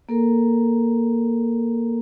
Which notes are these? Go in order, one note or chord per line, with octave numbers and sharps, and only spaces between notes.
A#3 A4 A#4 A#5